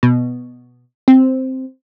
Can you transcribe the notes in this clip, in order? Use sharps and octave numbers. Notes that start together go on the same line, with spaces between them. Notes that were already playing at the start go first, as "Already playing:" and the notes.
B2
C4